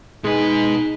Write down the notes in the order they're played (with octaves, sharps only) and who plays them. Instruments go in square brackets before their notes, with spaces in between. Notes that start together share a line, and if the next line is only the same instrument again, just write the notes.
[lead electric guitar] B2 B4 [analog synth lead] G#3 [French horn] D#4